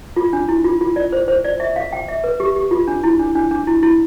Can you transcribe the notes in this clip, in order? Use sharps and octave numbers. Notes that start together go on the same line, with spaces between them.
F4
D4
E4
F4
F4
D5
C5
C5
D5
E5
F5
G5
E5
B4
G4
G4
F4
D4
E4
D4
D4
D4
E4
E4